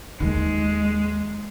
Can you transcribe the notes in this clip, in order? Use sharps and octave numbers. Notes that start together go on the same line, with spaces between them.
D#2 D#3 G#3